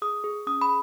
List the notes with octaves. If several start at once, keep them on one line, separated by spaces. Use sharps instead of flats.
G#4 D#6
G#4
C#4 D#6
B5